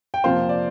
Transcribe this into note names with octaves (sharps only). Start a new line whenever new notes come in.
G5
F2 C3 F3 A#3 C5 F5
D5